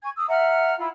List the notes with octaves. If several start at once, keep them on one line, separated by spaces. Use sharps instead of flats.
G#5 C#6 G#6
D#6 E6
E5 F#5 A#5 F6
E4 F4 B5